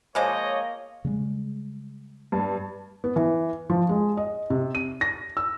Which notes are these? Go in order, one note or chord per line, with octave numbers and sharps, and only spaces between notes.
F3 G#3 A#3 C5 C#5 D#5
C#3 G3 G#3
G2
B3
E3
F3
G#3
D#5
C3
D#7
A#6
E6